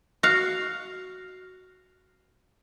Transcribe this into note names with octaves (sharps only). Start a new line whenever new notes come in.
F#4 F5